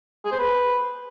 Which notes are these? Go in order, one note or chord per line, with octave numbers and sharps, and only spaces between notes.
G#4
C5
B4